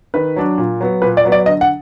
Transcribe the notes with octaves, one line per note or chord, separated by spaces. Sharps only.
D#3 B4
F#3 D4
A#2
F#3 B3
A#2 B4
D5
F#3 B3
D5
D3 D#5
F#5